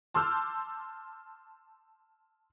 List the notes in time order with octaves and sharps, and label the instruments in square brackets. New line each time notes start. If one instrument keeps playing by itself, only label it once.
[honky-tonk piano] A5 C6 D6 E6 F6 G6